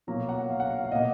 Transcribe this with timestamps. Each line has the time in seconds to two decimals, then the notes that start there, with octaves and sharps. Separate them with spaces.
0.07 B2 F#3 A#3 A#5
0.29 F#5
0.50 F5
0.60 F#5
0.70 F5
0.84 F5
0.91 B2 A#3 D#5